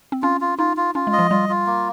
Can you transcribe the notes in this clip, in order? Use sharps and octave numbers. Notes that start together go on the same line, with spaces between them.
C4
C#4 F4
F4
D#4 F4
F4
C#4 F4
G#3
D#5
F3
G3 F4
F4
A#3